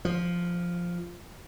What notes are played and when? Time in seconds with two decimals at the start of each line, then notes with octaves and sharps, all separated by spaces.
0.05 F3